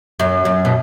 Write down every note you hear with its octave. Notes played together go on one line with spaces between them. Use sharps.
F#2
F#2
B2